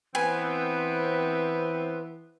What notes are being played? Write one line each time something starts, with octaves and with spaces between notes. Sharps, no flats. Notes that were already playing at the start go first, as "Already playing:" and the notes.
E3 B3 C4 B4 G#5